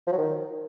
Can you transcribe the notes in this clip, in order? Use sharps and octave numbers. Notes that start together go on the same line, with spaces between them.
F3
F#3
D#3